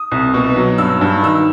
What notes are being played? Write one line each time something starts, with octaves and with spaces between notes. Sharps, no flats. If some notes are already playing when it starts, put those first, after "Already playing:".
Already playing: D#6
C2
B2
F#3
G2 E6
G2
D#3 E6